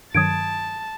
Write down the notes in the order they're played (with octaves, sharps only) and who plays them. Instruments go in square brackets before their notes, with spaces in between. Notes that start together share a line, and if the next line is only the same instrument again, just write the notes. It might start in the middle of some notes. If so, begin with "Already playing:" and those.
[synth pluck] G2 D#3 F#3 [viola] A5 [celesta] D#6 G#6 D7